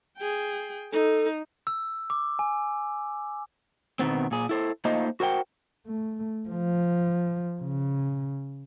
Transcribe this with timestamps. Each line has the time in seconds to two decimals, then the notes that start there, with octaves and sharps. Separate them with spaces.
0.17 G#4 G5
0.93 D#4 A4
1.67 E6
2.10 D6
2.39 G#5
3.99 B2 D#3 B3 C4
4.31 A#2 G#4
4.49 E4 A4 C5
4.85 A3 A#3 D#4 F4 C5 D#5
5.20 F#4 A#4 C5 F#5 G5
5.86 A3
6.49 F3
7.61 C#3